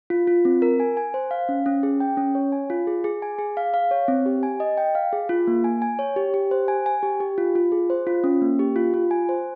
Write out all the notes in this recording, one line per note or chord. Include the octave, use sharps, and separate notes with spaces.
F4
F4
C4
A#4
G#5
G#5
C5
F5
C#4
C#4
G#4
G5
C#4
C#5
G#5
F4
G#4
G#4
G#5
G#4
F5
F5
C#5
C4
G4
G#5
D#5
G5
F5
G#4
F4
A#3
G#5
G#5
C#5
G4
G4
C5
G#5
G#5
G4
G4
F4
F4
G#4
C5
F4
C#4
A#3
G4
F4
F4
G#5
C5